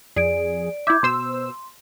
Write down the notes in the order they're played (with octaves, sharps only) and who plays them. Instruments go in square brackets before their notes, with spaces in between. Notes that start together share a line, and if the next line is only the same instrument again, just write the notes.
[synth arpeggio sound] F2 G#4 [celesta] D5 D7
[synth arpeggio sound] E4 E5 [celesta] D6 G6 G#6
[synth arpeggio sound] B2 C5 E6 [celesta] C6